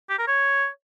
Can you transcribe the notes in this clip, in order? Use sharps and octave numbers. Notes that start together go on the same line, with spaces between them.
G4
A#4
C#5